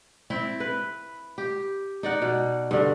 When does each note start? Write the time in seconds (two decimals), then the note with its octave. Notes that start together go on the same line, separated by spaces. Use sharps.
0.30 C4 E4
0.60 B4
1.38 G4
2.03 D#4 D5 F#5
2.22 B2
2.71 G2 D3